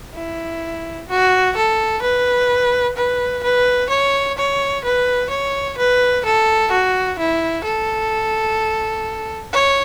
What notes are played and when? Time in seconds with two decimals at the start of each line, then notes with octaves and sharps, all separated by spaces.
0.15 E4
1.09 F#4
1.56 A4
2.02 B4
2.96 B4
3.43 B4
3.90 C#5
4.38 C#5
4.84 B4
5.30 C#5
5.78 B4
6.25 A4
6.71 F#4
7.19 E4
7.65 A4
9.53 C#5